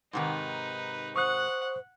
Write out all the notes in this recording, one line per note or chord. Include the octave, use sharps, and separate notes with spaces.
G#2 C3 D#3 D#4 B4
C5 F#5 C#6 D#6 F#6